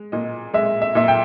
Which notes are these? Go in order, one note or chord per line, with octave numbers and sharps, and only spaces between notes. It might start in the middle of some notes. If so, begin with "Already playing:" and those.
Already playing: G#3
A#2 D#5
G#3 E5
E5
A#2 E5
G5